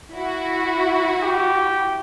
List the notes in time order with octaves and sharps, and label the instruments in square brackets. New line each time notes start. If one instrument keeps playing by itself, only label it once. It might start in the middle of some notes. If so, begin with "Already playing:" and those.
[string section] E4 F#4
[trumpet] G4